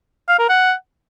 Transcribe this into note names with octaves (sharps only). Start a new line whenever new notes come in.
F5
A#4
F#5